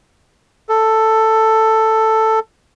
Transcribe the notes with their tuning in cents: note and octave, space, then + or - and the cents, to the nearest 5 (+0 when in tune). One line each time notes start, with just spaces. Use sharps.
A4 +5